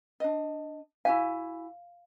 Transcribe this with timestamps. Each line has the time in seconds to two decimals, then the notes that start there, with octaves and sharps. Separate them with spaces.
0.20 D4 D#5
1.05 E4 F#4 F5 G#5